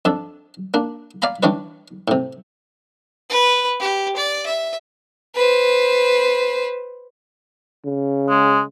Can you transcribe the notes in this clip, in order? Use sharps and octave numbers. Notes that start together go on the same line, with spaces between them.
F2 D4 A4 A5
A#3 D4
D5 F5 G#5 A#5 B5
E3 G3 C#4 D4 B4
A2 C3
B4
G4
D5
E5
B4 C5
C#3
G#3